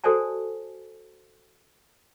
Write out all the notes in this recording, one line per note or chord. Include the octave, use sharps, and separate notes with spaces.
F#4 A4 C5 D5 G#5 A5